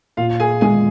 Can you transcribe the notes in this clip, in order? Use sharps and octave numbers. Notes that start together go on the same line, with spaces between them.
A#2 F4 F5
G#4 G#5
G#3 G#4 G#5